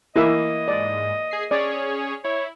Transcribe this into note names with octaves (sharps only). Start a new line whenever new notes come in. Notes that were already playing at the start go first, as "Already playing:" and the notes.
E3 A#3 E4 D#5 E5
G#2 D5
G#4 C7
C#4 G#4 C#5 D5
E4 C#5